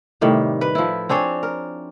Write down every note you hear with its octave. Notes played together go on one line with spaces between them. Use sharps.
A2 C3 D#3 G3
B4
F3 E4
C4 D4 G#4 C#5
A#4